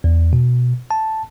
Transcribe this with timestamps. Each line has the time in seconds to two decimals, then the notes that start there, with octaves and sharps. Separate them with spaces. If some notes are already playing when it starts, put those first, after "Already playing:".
0.04 E2
0.33 B2
0.91 A5